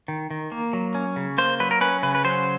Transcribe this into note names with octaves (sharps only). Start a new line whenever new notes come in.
D#3
D#3
A#3
F#3
C#4
C#3
A#3 C5
F#3 B4
A#4
C#4 B4
C#3 B4
B4
F#3 C5